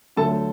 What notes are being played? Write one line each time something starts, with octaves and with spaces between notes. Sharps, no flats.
D2 D3 F#3 A3 A4 A5